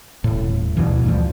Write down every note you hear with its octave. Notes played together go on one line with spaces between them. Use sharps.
D#1 A2
D2 G2 B2 E3
D2 G2 F3